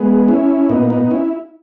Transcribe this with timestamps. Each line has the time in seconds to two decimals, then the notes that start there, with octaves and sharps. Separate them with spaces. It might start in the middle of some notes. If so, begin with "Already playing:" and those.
Already playing: G#3 B3
0.28 C#4 E4
0.69 A#2 B3 D#4
0.90 B3 D#4
1.11 C#4 E4